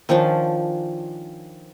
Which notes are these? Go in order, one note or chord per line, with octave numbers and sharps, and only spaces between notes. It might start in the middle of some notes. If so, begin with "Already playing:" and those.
D#3 F3 C#4 D4